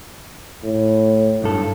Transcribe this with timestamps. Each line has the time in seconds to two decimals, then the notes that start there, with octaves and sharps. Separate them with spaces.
0.64 A2
1.42 B1 G2 A4